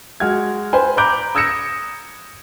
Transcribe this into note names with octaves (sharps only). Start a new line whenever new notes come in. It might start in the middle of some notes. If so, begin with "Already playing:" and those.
G#3 F#4 F6 G#6
B4 C5 G#5
A#5 B5 D6 F#6 G6 D7
D#6 E6 G#6 A#6 C#7 E7